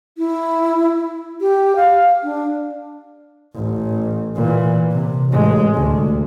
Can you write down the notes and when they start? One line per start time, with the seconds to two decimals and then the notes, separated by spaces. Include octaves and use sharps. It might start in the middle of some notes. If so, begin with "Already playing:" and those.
0.18 E4
1.41 G4
1.76 F5
2.23 D4
3.54 A1
4.35 A#2 E3
4.91 C3
5.30 A1 G#3
5.74 D2